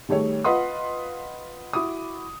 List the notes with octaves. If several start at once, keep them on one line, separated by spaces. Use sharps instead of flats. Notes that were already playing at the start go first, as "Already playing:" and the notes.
D#3 G3 A3 G#4 C#5
F4 B4 D#5 F#5 C6 D#6
E4 F#4 D6 D#6